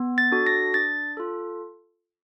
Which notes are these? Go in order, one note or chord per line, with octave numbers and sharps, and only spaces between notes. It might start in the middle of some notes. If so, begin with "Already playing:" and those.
Already playing: B3
A6
D4 F#4 A4
A#6
D4 A6
F4 A4